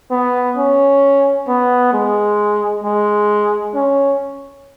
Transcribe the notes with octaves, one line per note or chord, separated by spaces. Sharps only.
B3
C#4
B3
G#3
G#3
C#4